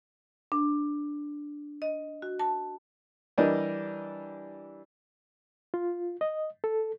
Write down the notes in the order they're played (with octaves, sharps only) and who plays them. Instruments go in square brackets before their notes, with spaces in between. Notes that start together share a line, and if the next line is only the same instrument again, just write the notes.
[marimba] D4
D#5
F#4
A5
[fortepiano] E3 G3 D4 G4 A#4 D#5
[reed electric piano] F4
D#5
A4